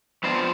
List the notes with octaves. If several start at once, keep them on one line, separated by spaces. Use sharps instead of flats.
F3 B3 C4 D4 F4 C5